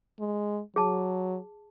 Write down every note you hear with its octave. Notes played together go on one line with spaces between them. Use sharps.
G#3
F#3 G#4 A5